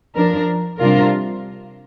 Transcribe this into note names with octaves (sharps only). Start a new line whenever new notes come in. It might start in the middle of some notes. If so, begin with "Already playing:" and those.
F3 D4 A#4
C3 G3 D4 F4 A#4